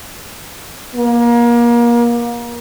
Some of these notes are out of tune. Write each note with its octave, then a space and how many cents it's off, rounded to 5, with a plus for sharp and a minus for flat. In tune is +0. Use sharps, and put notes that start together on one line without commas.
A#3 +30